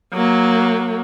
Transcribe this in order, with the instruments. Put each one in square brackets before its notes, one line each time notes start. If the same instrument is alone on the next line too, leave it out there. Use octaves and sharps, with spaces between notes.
[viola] F#3 A#3